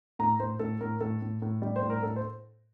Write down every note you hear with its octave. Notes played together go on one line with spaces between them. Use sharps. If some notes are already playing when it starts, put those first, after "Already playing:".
A2 A#5
A2 C5
A2 A4
A2 A#4
A2 A4
A2
A2
G3
C5
A2
A#4
A2 A4
C5